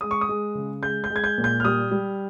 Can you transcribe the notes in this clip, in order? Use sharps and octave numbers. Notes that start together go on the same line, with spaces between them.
G#3 D#6
C#6
D#6
G#3
C#3
G#3 G6
G6
G#3
G#6
G6
A#2
G6
F6
G3 D#6
G3